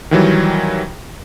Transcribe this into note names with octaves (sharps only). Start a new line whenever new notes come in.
D#3 E3 F#3 G3